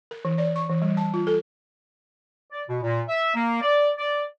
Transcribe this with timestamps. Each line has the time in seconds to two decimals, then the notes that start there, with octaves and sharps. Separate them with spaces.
0.11 A#4
0.25 E3
0.38 D5
0.56 C#6
0.69 E3
0.82 G3
0.97 A5
1.14 F4
1.27 A4
2.52 D5
2.69 B2
2.83 A#2
3.09 E5
3.35 A#3
3.61 D5
3.98 D5